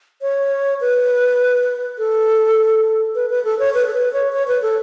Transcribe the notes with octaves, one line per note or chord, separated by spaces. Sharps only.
C#5
B4
A4
B4
B4
A4
C#5
B4
A4
B4
C#5
C#5
B4
A4